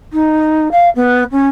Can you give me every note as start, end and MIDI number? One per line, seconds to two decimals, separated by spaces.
0.12 0.70 63
0.71 0.89 77
0.95 1.23 59
1.31 1.48 61